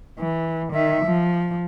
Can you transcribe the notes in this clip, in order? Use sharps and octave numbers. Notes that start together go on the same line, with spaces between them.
E3
D#3 E5
F3